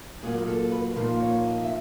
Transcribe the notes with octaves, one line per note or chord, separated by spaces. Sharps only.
A#2 F#3 A#3 G#4
A#4
A4
B4
A#2 F3 A#3 D#4 C5
C#5
D#5
E5